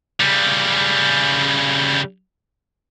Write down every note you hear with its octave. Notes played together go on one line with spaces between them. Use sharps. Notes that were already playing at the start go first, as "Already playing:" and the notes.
C#3 G3